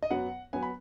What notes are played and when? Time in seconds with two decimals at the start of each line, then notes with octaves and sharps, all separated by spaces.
0.03 D#5
0.10 F#2 F#3 B3 F#5
0.53 F#3 B3 G#5
0.63 B5